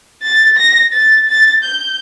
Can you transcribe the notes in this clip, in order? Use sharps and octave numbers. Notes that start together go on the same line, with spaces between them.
A6
A#6
A6
A6
G6